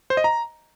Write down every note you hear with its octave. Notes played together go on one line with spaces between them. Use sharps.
C5
D#5
A#5